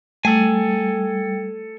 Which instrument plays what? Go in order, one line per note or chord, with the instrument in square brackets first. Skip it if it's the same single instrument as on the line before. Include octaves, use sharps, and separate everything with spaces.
[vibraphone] G3 [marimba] A3 [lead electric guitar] A4 G#5